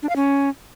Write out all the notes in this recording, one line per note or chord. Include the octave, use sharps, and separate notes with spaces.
D4
F5
C#4